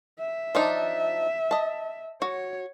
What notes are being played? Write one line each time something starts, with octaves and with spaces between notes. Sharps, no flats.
E5
F3 D4 D#4
D#5 A5
F#4 C#5